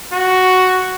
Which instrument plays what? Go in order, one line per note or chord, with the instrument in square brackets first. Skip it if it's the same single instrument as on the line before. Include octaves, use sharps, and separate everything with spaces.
[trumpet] F#4